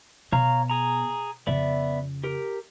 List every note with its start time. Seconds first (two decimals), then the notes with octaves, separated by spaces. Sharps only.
0.32 B2 C#5 F5 A#5
0.70 G#4 A#5
1.47 F2 C#3 B3 D5 E5
2.24 G4 A#4